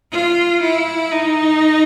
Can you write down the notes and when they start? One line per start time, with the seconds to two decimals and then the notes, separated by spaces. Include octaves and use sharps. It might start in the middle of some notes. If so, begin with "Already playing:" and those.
0.12 F4
0.62 E4
1.11 D#4